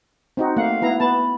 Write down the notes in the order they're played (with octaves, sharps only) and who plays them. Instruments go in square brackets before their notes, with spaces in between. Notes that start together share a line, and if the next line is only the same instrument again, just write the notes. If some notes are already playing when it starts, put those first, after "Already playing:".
[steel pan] C4 D#4 F#4
[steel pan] A3 A#3 F#5 [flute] F5
[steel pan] B3 E4 A#5
[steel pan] B3 A5 [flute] B5